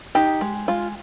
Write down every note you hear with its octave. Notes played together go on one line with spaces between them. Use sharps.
D#4 G4
G#3
G#3 F4